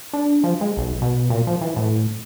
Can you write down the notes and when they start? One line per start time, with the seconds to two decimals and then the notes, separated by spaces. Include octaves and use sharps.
0.13 D4
0.44 F3
0.61 G#3
0.77 B1
1.02 B2
1.30 A#2
1.47 F3
1.61 E3
1.76 A2